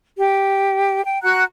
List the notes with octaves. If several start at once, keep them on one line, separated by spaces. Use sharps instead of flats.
G4
G5
F#4 F#5 A#5 F#6